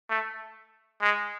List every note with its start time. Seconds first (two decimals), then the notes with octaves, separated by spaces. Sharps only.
0.10 A3
1.02 G#3